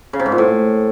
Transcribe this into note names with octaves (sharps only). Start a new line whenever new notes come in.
C#3
C3
G#2
A#2
A2